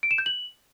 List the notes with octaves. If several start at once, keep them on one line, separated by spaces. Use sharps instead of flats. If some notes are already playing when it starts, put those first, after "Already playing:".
D7
E7
G6
F#7